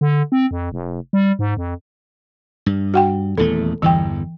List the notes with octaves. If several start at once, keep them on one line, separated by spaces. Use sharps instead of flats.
D3
C4
F2
F1
G3
G#2
F2
G2
F#4 F#5 G5
D#1 E2 A3 A4
G1 E2 E3 G5